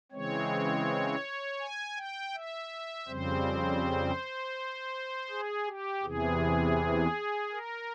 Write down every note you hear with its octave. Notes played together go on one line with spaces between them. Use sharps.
C#3 E3 G#3 C4 C#5
G#5
G5
E5
F2 C#3 G3 C4 C5
G#4
G4
E2 C3 E3 G#4
A#4